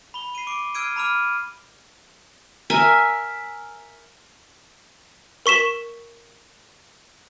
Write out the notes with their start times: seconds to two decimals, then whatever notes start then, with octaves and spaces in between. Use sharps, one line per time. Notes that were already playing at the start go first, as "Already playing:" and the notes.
0.14 B5 G7
0.35 C7 D#7
0.47 D6 D7
0.75 E6 F6 G#6 C7 D7 D#7
0.96 A#5 B5 D6 F6 D#7
2.70 A#4 E5 G#5
5.46 A#4 C#6 B6 E7